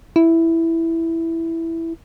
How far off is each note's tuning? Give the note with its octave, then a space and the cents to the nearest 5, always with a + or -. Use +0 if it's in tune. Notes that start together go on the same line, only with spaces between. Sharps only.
E4 +0